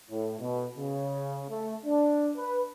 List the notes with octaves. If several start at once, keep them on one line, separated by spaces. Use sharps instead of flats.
A2
B2
C#3
A3
D4
B4